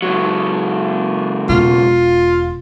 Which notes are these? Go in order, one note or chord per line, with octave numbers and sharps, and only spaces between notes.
C#2 F#3
E1 F4